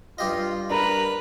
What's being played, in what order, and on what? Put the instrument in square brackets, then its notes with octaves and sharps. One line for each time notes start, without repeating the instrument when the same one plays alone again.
[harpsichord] G2 G4 D#5 [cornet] F4
[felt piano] D4 A#4 [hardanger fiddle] B4 [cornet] A#5